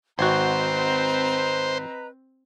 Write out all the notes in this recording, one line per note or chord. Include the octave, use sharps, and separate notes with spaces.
G#1 C4 F#4 B4 C5 D#5 A#5